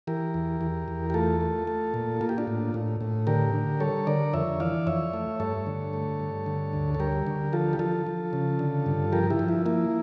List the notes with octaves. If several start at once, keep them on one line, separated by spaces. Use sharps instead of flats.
E3 G4 A#4
E2
E2
E2
G4
A3 F4 A4
A3
A3
A#2
A#3 F4
G4
D4 F4
A2
A2
A2
D3 G4 A#4
D3
G3 A4 C#5
D3 A#4 D5
F2 C#5 E5
E3 D5 F5
F2 C#5 E5
A3
G2 A4 C#5
D3
A3
G2
D3
D2
A4
G3 G4 A#4
D3
F3 F4 A4
G4
F3 F4 A4
F3
C#3
D3
G2
F3 G4 A#4
E4 G4
F3
E4
A#3 E4